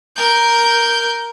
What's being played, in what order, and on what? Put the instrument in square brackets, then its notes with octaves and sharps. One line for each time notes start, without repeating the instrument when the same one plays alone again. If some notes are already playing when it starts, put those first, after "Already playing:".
[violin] A#4 G6